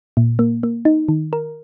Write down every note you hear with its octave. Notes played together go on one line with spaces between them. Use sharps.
A#2
A#3
A#3
D#4
D#3
A#4